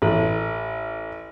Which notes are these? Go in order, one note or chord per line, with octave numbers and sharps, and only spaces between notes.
A1